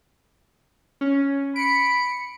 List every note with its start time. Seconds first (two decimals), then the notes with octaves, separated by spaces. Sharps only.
1.01 C#4
1.56 B5 C#7 D7